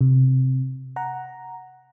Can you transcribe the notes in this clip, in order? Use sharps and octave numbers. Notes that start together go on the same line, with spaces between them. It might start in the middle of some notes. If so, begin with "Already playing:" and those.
C3
F#5 A#5